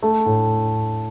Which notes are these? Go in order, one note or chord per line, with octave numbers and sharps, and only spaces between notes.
A3
A2